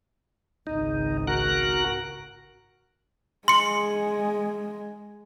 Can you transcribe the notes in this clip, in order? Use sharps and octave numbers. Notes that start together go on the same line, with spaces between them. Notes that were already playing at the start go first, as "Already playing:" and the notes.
G#1 C#2 D#4
F#4 A#4 F#6
G#3 C6 C#7